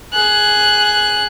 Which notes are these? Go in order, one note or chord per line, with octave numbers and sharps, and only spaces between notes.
G#4 F#6